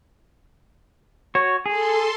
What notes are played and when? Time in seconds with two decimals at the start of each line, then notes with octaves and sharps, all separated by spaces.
1.35 F#4 C#5
1.66 G#4 A4 C6